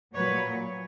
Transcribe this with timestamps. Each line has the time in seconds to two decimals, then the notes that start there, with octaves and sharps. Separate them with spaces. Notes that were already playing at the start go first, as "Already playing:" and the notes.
0.15 A#2 F#3 B4 C#5